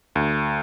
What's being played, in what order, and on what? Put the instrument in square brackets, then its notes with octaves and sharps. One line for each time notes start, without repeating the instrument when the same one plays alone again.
[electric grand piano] D2